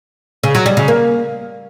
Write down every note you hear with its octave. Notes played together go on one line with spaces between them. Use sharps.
C#3
F#3
G3
C#3
A#3